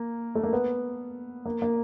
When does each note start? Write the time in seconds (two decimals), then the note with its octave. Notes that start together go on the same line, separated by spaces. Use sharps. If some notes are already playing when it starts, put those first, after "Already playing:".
Already playing: A#3
0.35 A3
0.43 A#3
0.53 B3
1.45 A#3
1.62 A#3